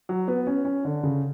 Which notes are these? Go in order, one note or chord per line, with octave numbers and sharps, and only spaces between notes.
F#3
B3
C#4
C#4
D3
C#3